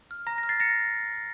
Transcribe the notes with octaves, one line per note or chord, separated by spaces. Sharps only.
F6
A#5 A#6
A#6
F6
A6 C7
A#5 A#6 C#7